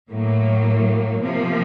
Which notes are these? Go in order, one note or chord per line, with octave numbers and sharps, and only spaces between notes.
A2 F#3 A#3
C3 F3 A#3